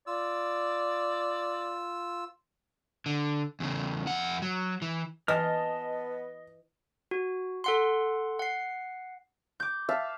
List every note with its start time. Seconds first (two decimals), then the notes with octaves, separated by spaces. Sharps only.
0.07 F4 D5 E6
3.06 D3
3.60 E2 C#3
4.07 F2 F#5
4.42 F#3
4.82 E3
5.28 E3 B3 D#5 A5 F6
7.11 F#4
7.64 A4 F#5 C6
8.39 F#5 C7
9.60 D6 G6
9.89 E5 F5 A5